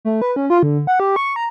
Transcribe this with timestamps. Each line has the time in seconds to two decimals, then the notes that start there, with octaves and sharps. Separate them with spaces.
0.05 A3
0.22 B4
0.36 C#4
0.50 F4
0.63 D3
0.87 F#5
1.00 G4
1.16 C#6
1.36 A#5